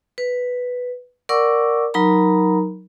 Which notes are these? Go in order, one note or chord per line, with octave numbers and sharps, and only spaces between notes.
B4
A#4 D5 F#5 C#6 D6 E6
F#3 D#4 A#4 A#5 B5